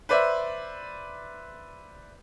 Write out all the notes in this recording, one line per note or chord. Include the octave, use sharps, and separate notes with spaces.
B4 C5 D5 E5